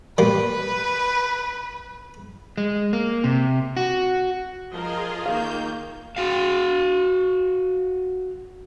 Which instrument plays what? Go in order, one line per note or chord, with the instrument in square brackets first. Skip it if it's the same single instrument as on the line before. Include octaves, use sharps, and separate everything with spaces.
[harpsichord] G3 A#3 [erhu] B4
[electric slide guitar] G#3
A#3
C3
F#4
[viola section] F3 A#4 D#5 [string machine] F4 G#4
[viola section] D#3 A#3 [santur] F5 [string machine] G6
[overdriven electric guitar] F#4 F5